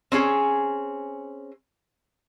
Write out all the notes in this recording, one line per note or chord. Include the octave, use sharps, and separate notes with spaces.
C4 C#4 G#4